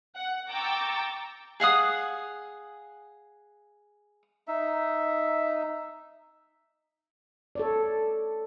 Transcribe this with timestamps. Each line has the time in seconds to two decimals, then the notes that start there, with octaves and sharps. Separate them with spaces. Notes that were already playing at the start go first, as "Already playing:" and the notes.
0.15 F#5
0.48 G5 A#5 C#6 D6 E6 A6
1.60 G#4 F5 F#5 D#6
4.48 D#4 E5
7.55 A4 C#5 D5